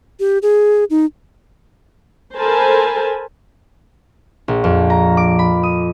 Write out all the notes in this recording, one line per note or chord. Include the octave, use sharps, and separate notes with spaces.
G4
G#4
D#4
A4 A#4 C5 G#5 A5 B5
A#1
F2
A#5
D6
B5
D#6